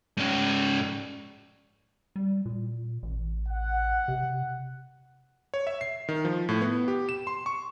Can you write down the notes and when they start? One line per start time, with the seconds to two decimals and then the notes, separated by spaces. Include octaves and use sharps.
0.17 G#2 C#4
2.16 G3
2.45 A#2
3.03 A1
3.49 F#5
4.08 C3
5.54 C#5
5.67 E5
5.81 C7
6.09 D#3
6.25 F3
6.49 A2
6.61 B3
6.88 G4
7.09 E7
7.27 C6
7.46 C#6